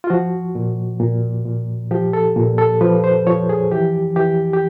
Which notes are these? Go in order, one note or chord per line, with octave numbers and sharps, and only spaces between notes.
F4
F3 F#4
A#2
A#2
A#2
F3 G4
A4
A#2
A4
F3 B4
C5
F3 C#5
G#4
E3 G4
E3 G4
G4